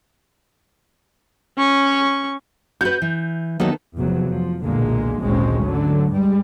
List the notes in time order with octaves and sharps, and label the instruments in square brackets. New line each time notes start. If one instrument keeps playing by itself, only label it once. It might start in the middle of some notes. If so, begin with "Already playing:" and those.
[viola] C#4 C#6
[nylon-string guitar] F#4 B4 [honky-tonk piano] G6
[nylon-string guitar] E3
[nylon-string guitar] D#3 B3 A4 [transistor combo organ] F#3 A#3 D#4
[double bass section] F1 E2 F3 F#3
F3
B1 E2 A#2 D3 G#3 A#3
G#1 D2 A#2 G#3 C4 C#4
D3 F#3 A3
G2 G3 G#3